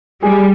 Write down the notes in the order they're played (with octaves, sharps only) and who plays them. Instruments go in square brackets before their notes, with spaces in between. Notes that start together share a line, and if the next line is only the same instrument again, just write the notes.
[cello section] G3 [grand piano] G#4